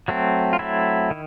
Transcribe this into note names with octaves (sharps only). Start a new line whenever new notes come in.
F#3 A3 C4
F4
F#3 A3 C4 E4
D#3